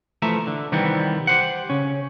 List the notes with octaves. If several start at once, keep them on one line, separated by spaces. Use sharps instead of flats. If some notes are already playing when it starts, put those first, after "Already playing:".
E3 F3 A3 E5 A#5
D3
C2 D#3 E3 G3 B3 C4
G4 C5 F#5
C#3 C#4